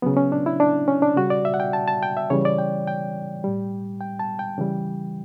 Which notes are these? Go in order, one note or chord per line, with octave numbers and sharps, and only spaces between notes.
C#3 F#3 B3
C#4
D4
E4
D4
C#4
D4
C#3 G3 F#4
D5
E5
F#5
G5
A5
A5
G5
E5
C#3 E3 G3 C#5
D5
G5
G5
A2 G3
G5
A5
G5
C#3 E3 G3